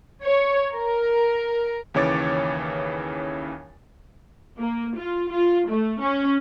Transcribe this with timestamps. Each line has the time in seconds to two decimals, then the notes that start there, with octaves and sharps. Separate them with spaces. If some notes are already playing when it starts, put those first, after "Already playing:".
0.23 C#5
0.74 A#4
1.94 D#2 C#3 E3 C#5 D6 A6
4.58 A#3
4.98 F4
5.31 F4
5.69 A3
6.03 C#4